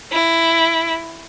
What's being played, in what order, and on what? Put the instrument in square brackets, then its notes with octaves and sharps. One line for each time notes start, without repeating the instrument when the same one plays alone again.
[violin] E4